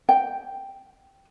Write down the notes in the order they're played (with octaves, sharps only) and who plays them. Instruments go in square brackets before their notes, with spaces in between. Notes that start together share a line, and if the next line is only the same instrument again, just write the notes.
[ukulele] G5